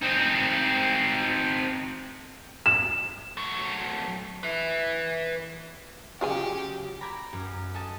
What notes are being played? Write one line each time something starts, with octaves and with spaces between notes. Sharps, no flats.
C4 D#4
E7
F#3 A3
B4 E5
C#3 F#3 F4 G4 G#4 G#5
A#5 B5 D6 G6 G#6
F#2
A4 D#5 G#5 A5